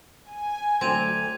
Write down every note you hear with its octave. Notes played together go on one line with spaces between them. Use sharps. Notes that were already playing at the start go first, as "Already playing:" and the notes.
G#5
D3 F#3 A3 C4 G#6 D#7 F7